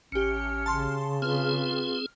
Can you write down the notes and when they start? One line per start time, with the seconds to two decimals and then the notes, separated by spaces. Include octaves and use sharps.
0.12 A1 C#4 G4 F6 C#7
0.66 C#3 A5 C6
1.22 C4 F4 G#4 B4 F6